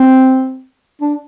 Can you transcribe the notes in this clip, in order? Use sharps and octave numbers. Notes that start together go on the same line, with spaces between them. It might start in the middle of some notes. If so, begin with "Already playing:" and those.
Already playing: C4
D4